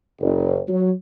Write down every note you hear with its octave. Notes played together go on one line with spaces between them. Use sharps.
F#1
F#3